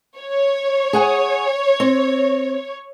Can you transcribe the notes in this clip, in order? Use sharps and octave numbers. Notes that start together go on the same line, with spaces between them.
C#5
G#4 F#5 G#5
C4